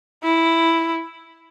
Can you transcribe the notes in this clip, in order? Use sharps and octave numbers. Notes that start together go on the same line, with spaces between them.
E4